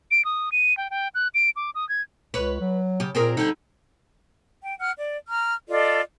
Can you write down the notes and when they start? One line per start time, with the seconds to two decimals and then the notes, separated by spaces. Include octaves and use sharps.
0.11 D7
0.25 D#6
0.52 D#7
0.77 G5
0.90 G5
1.15 F#6
1.34 D7
1.56 D6
1.75 D#6
1.89 G#6
2.34 C#2 B4 C#5
2.61 F#3
3.00 C#3 G4
3.15 A#2 C4 G#4 A#4
3.37 D3 G3 D#4
4.62 G5
4.79 F#5 F6 F#6
4.97 D5
5.28 A#5 F6
5.68 F4 A4 D5 D#5